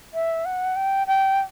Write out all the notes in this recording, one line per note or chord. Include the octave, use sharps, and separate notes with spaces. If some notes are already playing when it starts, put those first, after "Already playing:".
E5
F#5
G5
G5